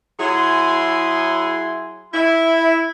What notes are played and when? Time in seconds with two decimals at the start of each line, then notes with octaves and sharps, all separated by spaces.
0.19 F#3 E4 G#4 G#5 C6
2.13 E4